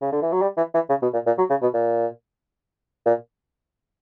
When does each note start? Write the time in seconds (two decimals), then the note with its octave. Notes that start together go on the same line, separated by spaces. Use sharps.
0.02 C#3
0.12 D3
0.22 E3
0.32 F#3
0.42 G3
0.57 E3
0.74 E3
0.89 C#3
1.02 B2
1.13 A#2
1.27 A#2
1.38 F#3
1.50 C#3
1.62 B2
1.74 A#2
3.06 A#2